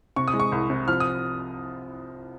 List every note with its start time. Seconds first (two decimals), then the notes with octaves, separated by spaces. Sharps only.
0.16 C3 C#6
0.28 D#6
0.34 G#3
0.40 C#6
0.52 C2
0.70 C3
0.88 F3 F6
1.00 D#6